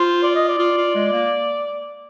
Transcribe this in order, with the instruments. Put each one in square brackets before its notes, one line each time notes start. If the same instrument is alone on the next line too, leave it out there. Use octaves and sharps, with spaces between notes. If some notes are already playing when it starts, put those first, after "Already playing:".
Already playing: [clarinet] F4 [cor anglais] C5
[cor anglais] D5
D#5
D5
[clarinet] F4
F4
G#3
A#3